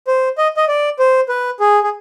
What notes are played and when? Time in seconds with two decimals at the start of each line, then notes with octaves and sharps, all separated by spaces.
0.07 C5
0.38 D#5
0.57 D#5
0.68 D5
0.99 C5
1.29 B4
1.60 G#4
1.83 G#4